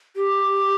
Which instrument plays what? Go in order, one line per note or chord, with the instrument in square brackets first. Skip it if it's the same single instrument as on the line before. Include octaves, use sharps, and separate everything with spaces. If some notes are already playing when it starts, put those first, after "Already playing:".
[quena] G4